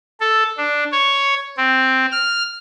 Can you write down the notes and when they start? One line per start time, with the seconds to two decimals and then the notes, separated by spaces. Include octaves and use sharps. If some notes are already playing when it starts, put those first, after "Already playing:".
0.20 A4
0.58 D4
0.92 C#5
1.57 C4
2.12 F6